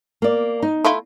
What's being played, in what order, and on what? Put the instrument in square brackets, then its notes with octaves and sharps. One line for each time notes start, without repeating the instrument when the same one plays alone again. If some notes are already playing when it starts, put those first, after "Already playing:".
[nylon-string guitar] A#3 D5
D#4
[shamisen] A3 E4 F4